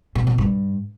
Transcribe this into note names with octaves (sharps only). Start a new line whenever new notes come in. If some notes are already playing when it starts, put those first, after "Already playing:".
B2
B2
G2